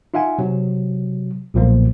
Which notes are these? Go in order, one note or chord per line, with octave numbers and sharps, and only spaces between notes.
D#4 F4 E5 F#5 G#5
C3 F#3
B1 A#2 F3 A#3